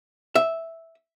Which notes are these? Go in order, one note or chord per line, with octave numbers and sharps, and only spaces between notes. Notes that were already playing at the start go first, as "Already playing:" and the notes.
E5